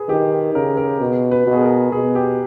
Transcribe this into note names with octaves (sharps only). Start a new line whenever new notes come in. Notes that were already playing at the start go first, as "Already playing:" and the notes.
Already playing: G#4 B4
D#3 G4
C#3 A#4
A#4
B2
B4
B2
G#4
A#4
B2 G#4
G4